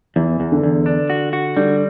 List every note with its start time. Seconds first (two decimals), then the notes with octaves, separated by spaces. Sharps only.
0.16 E2 E3
0.40 E2
0.52 D3
0.63 E2
0.86 D4
1.10 F#4
1.33 F#4
1.56 D3 G3